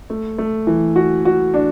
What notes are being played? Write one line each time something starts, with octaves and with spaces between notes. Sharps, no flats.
A3
A3
E3
F#4
F#4
D4